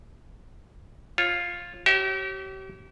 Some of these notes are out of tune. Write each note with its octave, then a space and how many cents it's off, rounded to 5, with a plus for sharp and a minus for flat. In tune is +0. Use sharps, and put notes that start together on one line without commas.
F4 +5 C#5 -25
G4 -40 C#5 -20 E5 -15